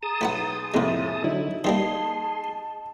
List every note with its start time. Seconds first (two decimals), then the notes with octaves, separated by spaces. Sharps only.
0.03 G#4 A5 A#5 D#6
0.21 B1 A3 E4 F#5
0.74 F2 A2 C3 G#3 A#3 E5
1.24 D3 F#3 D#4 E4
1.64 E3 G3 A#3 D#4 G#4 A5 C6